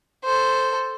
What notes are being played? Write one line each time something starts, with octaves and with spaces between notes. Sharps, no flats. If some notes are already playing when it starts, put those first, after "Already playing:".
A4 C5